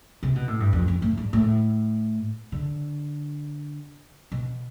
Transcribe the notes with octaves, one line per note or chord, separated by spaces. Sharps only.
C3
B2
A2
G2
F2
F2
A2
G2
A2
D3
B2